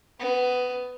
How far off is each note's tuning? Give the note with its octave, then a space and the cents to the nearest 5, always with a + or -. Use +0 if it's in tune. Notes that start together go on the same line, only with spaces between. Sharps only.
B3 +15 B4 +0